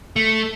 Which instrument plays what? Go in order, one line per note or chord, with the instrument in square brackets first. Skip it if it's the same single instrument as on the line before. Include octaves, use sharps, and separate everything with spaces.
[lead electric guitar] A3